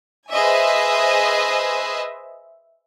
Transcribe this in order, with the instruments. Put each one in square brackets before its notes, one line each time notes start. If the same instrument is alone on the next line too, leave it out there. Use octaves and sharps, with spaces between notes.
[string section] G#4 B4 C5 D#5 E5 G#5